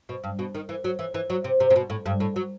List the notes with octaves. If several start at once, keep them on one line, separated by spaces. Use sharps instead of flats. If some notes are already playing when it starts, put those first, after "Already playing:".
B2
G2
B2
D#3
E3
F#3
E3
E3
F#3
C3
C3
C3
B2
A2
G2
A2
F#3